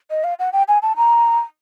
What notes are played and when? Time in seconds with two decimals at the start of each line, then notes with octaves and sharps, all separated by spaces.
0.10 D#5
0.24 F5
0.39 F#5
0.53 G5
0.68 G#5
0.82 A5
0.97 A#5